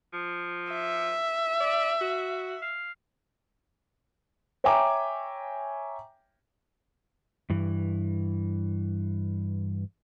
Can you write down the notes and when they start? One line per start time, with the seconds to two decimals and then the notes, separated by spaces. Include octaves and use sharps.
0.13 F3
0.72 E5
1.61 D5
2.01 F#4
2.62 F5
4.64 C#5 E5 G5 G#5 A#5 D6
7.50 G2 E3